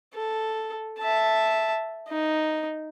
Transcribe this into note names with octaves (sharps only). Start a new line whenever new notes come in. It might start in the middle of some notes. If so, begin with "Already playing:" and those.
A4
E5 A5
D#4